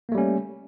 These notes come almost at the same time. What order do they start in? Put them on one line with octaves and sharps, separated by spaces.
A#3 A3 G3 C#4